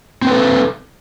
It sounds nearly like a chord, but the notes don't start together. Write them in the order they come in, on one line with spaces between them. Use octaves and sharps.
C4 B4 A4